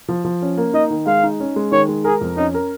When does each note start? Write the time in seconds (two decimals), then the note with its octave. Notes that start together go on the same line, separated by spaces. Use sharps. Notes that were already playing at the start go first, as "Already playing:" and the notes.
0.08 F3
0.25 F3
0.42 C#4
0.57 A#3
0.74 D#4 D#5
0.90 D#3
1.06 G#3 F5
1.23 D#4
1.40 C#4
1.56 G#3
1.72 D#3 C#5
1.88 G#3
2.04 G#4 A#4
2.21 F2
2.37 C#4 D#4
2.54 A#4